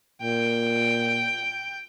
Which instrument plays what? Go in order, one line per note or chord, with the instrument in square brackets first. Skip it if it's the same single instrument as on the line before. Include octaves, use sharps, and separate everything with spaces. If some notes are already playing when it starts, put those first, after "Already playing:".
[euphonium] A#2 [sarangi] G5